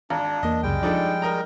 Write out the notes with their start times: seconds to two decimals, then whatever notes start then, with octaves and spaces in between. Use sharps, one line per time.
0.10 G#1 D4 F5 A#5
0.43 E2 A#3 D#5
0.63 C#2 F#2 C#3 G3 G#3 G5
0.83 F3 D4 D#4 A4
1.22 A#4 D#5 A#5